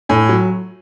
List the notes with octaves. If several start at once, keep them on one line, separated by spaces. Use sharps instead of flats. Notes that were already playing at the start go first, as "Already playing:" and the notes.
A2 G#5
F#3